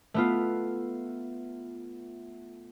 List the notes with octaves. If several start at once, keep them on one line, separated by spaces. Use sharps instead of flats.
A3 B3 F4